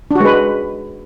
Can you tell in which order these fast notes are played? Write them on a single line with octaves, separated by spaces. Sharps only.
D4 F#4 G#3 B4